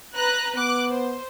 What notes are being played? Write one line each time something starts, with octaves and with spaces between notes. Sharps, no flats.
B4 A#5 F#6
B3 D6 F#6
C5